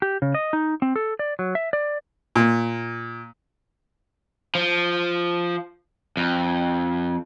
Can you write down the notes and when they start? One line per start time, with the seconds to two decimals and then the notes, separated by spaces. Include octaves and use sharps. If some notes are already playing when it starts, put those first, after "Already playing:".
0.02 G4
0.22 C#3
0.34 D#5
0.53 D#4
0.82 C4
0.96 A4
1.19 D5
1.39 F#3
1.55 E5
1.73 D5
2.36 A#2
4.55 F3
6.17 F2